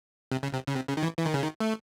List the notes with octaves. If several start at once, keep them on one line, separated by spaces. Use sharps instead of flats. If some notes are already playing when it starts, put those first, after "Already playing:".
C3
C#3
C3
C#3
C3
C#3
D#3
E3
E3
D#3
C#3
D#3
A3